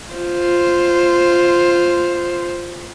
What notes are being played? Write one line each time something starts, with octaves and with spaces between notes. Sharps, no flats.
F4 C5